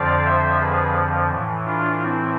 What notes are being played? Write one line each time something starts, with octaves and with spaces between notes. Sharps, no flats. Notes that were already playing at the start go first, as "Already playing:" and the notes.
Already playing: F2 D3 F3 D5 F5
C5 E5
G#4 B4
A2 E3
D4 F4
C4 E4